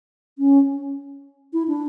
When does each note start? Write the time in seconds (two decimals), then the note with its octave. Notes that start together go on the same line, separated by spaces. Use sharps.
0.39 C#4
1.53 E4
1.68 D4